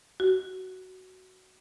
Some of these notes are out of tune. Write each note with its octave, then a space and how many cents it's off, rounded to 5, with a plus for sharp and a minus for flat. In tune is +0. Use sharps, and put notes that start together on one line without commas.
F#4 +10